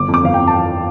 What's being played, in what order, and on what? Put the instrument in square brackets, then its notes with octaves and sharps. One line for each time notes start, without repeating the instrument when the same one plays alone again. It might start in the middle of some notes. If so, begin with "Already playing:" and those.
Already playing: [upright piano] G1 D6
F2
D6
G1 F5
F2 G5
A5
E3 G5